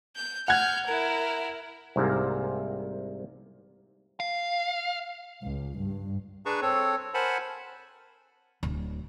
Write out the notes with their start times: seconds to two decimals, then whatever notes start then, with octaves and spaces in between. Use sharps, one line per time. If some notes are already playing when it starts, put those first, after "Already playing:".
0.16 G6
0.48 F#5 F6 G6 G#6
0.87 E4 A#4
1.96 C2 G#2 C3 A#3
4.20 F5
5.44 C#2
5.79 G2
6.46 D4 G#4 B4 A5 A#5 C#6
6.62 C4 A4 C#5
7.14 A#4 C5 F#5 G#5 A5 B5
8.63 D1